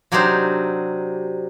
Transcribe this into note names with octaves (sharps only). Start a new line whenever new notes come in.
C3 F#3 C4 D4 D#4 C5